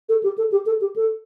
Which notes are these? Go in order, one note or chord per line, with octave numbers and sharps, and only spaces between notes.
A4
G4
A4
G4
A4
G4
A4